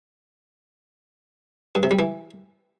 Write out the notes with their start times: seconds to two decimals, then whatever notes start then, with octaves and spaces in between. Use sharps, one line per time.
1.75 G2
1.83 C3
1.91 G3
1.99 E3